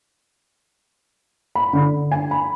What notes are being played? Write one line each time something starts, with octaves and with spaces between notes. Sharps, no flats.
B5
D3
G#5
B5